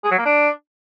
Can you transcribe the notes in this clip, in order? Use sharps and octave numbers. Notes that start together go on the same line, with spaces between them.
G#4
F#3
A#3
D4